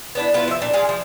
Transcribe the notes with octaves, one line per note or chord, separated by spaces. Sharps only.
B3 D4 E4
B3 E4 F4 B4
F3 E5
A#2 D4
G#3 G#4 F5
F3